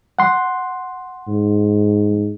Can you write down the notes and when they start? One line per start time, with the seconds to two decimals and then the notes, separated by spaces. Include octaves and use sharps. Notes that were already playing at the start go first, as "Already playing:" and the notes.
0.19 F#5 C6
1.28 G#2